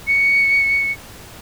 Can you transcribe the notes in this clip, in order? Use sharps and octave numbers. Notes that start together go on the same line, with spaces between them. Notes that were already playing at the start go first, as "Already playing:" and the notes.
C#7